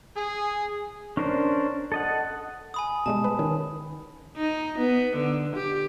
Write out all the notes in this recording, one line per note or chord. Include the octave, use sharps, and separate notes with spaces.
G#4
C#4 D4 A#4 C5
A4 D#5 F#5
G#5 B5 D#6
B2 G3 G#3 A5
B4
D#3 C#4
D#4
B3
D3
G4